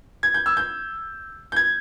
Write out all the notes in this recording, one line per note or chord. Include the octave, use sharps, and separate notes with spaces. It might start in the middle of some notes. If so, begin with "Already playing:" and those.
G#6
G6
E6
G6
G6
G#6